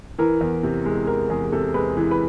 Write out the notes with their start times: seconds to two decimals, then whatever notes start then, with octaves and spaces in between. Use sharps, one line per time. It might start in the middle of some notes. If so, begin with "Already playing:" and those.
0.19 E3 A#4
0.41 E2
0.63 C3
0.86 G#3
1.07 E3 A#4
1.30 E2 G#4
1.52 C3 A4
1.74 G#3 B4
1.97 E3
2.11 B4